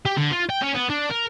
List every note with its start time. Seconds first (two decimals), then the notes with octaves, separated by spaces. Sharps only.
0.06 G4
0.17 D3
0.32 F4
0.50 G5
0.62 C#4
0.75 B3
0.90 D4
1.11 A#4